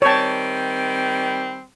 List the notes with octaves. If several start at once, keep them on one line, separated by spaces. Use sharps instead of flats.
D#3 G3 C4 C#5 A5